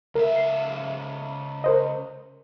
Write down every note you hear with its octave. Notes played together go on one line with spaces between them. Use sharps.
C#2 A#4 E5
C7
A#4 C5 D#5